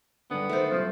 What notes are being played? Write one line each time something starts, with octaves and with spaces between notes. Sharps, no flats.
G2 D3 B3
D#3 A3 C5
C2 F#2 F3